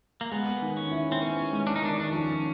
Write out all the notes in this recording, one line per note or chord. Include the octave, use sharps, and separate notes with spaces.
A#3
G#3 B3
D#3
C#4
E4
C4
B3 C#4
G#3
D4
D#4
D#3 D4
D4
F3 C#4